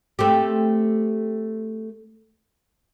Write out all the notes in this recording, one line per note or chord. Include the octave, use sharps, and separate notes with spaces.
A3 C4 G4